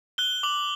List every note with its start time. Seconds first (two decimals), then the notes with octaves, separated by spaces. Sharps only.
0.18 F#6 G7
0.43 D6 F#7